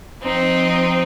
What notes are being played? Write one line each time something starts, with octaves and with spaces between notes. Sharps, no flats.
F3 C4 D#4